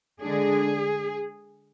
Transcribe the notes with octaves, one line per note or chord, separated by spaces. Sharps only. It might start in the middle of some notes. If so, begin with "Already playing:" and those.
D3 G#3 D4 G#4